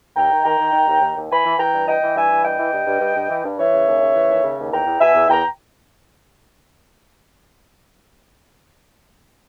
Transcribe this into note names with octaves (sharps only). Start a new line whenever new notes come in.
D#2 G5 A#5
D#3
D#3 G5 A#5
D#3
D#3
D#2
D#2
D#2
E3 G#5 B5
E3
E3 G5 A#5
G2
E3 D#5 G5
E3
G2 E5 G#5
E3
G2 D#5 G5
E3
G2
G2
G2
G2
E3
G2
E3 C#5 E5
C#3
D#2
C#3
E3
D#2
C#3
D#2
E2 G5 A#5
E2
B2 E5 G#5
E2
E2 G5 A#5